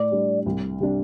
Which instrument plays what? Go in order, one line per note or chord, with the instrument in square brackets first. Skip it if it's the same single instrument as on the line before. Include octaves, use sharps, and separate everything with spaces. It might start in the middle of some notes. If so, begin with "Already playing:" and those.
Already playing: [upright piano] A2 [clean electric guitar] D5
[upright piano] G3 D4
C2
C3 G3 D4